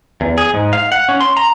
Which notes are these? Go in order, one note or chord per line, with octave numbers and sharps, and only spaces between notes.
E2
G#4
G#2
F5
F#5
C#4
C6
A#5